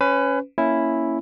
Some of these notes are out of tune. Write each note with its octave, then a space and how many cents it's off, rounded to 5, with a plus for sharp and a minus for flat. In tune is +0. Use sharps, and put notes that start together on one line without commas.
C#4 +0 B4 +25
A#3 +0 C#4 +0 E4 +0